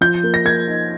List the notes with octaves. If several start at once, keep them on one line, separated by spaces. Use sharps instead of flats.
F3 G6
A#3
A#6
A#3 G#6
D#4